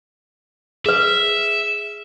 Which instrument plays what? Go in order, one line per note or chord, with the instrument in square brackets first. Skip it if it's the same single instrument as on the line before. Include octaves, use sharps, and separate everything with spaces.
[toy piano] G#4 B4 [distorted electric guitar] E5